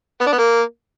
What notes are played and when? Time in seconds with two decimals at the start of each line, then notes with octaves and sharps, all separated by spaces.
0.21 B3
0.27 D4
0.32 B3
0.38 A#3